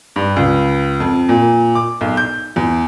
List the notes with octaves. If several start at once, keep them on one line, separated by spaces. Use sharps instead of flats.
G2
C#2
F2
A#2
D6
B1
G6
E2